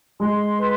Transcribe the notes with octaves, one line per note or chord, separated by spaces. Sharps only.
G#3 C6
B4